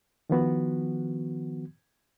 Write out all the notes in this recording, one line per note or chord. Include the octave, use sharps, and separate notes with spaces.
D#3 F3 B3 F#4